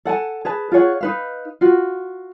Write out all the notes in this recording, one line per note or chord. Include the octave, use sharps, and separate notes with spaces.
A4 F#5 G#5 A5
G#4 B4 A5
F4 G#4 C#5 F#5
D#4 B4 F5
F4 F#4